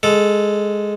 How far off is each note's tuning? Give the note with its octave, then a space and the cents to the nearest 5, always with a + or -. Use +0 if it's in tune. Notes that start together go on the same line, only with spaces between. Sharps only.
G#3 +0 A4 -10